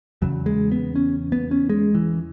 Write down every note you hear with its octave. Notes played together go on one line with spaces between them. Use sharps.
E2 C#3 F#3
G#3
B3
C#4
B3
C#4
G#3
E3